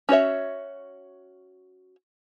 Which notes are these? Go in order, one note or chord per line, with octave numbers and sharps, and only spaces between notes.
C#4 F#4 C#5 E5